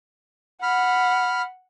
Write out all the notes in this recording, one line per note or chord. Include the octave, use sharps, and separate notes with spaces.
F#5 B5 F6